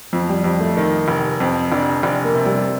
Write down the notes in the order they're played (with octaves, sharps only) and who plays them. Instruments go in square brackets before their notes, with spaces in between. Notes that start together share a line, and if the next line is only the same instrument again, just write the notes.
[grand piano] F2 [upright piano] F3
[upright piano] G3
[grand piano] F2 [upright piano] G3
[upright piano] A3
[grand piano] D#3
F1
[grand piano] F2 [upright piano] C4
[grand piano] F1 [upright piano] D4
[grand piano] F1 [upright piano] D4
[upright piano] A#3
[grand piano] C3
[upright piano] G3